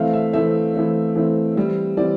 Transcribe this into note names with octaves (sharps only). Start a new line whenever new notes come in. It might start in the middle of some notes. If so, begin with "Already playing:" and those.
Already playing: E3 A3 C4 F5
E5
E3 A3 C4 E5
E3 A3 C4
E3 A3 C4
E3 G3 C4
E3 G3 C4 D5